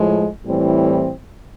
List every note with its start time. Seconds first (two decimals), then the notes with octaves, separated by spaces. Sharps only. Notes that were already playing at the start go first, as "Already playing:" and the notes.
Already playing: A2 F3 G#3
0.44 A2 E3 G3 C4